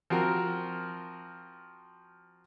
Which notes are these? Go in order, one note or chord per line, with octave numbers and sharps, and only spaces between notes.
F3 C4 F#4 A#4